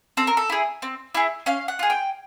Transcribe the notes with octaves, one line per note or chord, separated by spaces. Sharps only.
C4 A4
A#4
A4
E4 G#4
C4
E4 G#4
C#4 F5
F#5
F4 G#4
G5